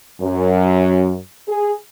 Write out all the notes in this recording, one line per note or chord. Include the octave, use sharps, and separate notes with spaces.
F#2
G#4